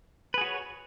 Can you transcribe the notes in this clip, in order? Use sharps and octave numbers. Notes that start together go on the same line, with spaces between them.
F#4 G#4 B4 C#5